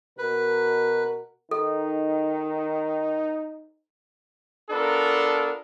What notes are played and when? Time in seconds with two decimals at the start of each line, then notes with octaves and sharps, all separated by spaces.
0.18 B2 F#4 A#4 B4
1.51 D#3 D#4 A4
4.71 B3 D4 F4 A4 A#4